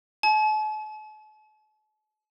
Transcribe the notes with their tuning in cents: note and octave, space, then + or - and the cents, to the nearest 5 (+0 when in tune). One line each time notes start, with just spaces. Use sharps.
A5 -45